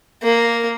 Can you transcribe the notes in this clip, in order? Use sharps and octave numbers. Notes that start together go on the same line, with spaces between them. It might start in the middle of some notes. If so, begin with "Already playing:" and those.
A#3